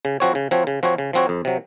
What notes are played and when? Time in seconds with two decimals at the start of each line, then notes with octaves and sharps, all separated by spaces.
0.05 C#3
0.20 F3 C4 F#4 C#5
0.35 C#3
0.51 F3 C4 F#4 C#5
0.67 C#3
0.83 F3 C4 F#4 C#5
0.98 C#3
1.13 F3 C4 F#4 C#5
1.29 F2
1.45 C3 F#3